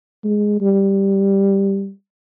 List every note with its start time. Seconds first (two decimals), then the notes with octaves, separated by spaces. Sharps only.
0.24 G#3
0.61 G3